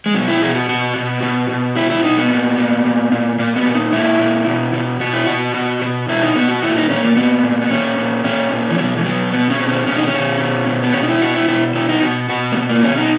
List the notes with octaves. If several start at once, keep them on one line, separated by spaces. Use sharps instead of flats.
G#3
B2 F#3
E4
B2 G#4
F#4
B2 F#4
B2
B2
B2
B2 E4
E4
B2 D#4
B3
A#2
A#2
A#2
A#2
A#2 A#3
B3
A#2
D#4
A#2 E4
A#2
B2
B2
B2 F#4
E4
B2 F#4
B2
B2
B2 E4
D#4
B2 B3
F#4
A#2 E4
D#4
A#2 C#4
A#3
A#2 B3
A#2
B3
A#2 C#4
A#2
A#2 C#4
A#2
E3
B2 F#3
E3
B2 F#3
B2 B3
C#4
B2
C#4
B2 C#4
D#4
C#4
B2
B2
B2
B3
B2 C#4
D#4
E4
B2 F#4
E4
B2 E4
B2 E4
D#4
B2 F#4
B2 F#4
A#3
B2 B3
A#3
B2 C#4
D#4